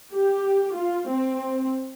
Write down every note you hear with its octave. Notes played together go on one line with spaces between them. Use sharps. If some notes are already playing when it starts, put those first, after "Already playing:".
G4
F4
C4